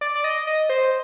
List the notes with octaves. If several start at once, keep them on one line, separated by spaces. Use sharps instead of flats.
D5
D5
D#5
D#5
C5